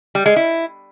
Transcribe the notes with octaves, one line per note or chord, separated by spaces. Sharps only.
G3
G#3
E4